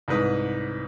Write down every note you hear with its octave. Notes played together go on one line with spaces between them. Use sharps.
C2 G#2 B4 D#6